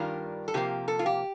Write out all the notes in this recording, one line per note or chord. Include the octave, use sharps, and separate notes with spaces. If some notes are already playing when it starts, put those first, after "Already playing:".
Already playing: G2 D#3 G3 D4 F4 A#4
A4
C3 F3 A#3 G4
A4
F4
G4